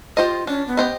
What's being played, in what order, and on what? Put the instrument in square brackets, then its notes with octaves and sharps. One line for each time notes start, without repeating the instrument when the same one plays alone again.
[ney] F4 [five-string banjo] G4 C5 D#5
[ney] C#4 [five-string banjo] D4
[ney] B3
[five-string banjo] G4 C5 D#5